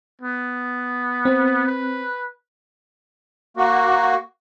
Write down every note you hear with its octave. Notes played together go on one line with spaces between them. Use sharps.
B3
C4
B4
A#3 F#4